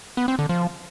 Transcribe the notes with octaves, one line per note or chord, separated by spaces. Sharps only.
B3
C4
D3
F3